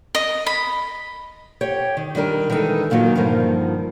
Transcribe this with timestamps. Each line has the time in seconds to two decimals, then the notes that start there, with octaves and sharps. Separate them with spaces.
0.15 D#5
0.46 B5
1.61 G4 C#5 G5
1.97 D#3
2.15 D#3 G3 D4 A#4
2.50 D#3 E3 G#3 D#4 A4
2.90 F#2 A#2 D#3 F#3
3.16 G2 D3 D#3 F3 A#3